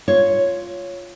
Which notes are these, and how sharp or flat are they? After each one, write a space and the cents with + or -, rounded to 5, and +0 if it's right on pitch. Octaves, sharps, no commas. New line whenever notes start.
F4 +0 C#5 +0